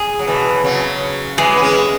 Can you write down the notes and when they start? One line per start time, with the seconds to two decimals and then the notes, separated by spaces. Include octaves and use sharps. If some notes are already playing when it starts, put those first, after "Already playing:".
Already playing: G#4
0.19 F#3
0.27 B2 E3
0.64 C#3 F#3
1.37 E3 G#3 G#4
1.56 B3
1.62 G#3 C#4